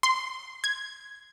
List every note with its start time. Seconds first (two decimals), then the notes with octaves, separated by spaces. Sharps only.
0.03 C6
0.64 G#6